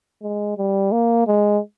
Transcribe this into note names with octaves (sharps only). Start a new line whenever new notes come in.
G#3
G3
A#3
G#3